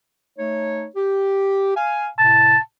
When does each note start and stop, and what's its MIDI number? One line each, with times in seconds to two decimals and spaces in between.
0.38 0.86 57
0.38 0.86 63
0.38 0.86 73
0.96 1.76 67
1.76 2.08 77
1.76 2.08 80
2.19 2.55 45
2.19 2.55 48
2.19 2.58 81